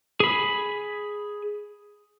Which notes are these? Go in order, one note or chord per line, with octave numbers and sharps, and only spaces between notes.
G#4 B5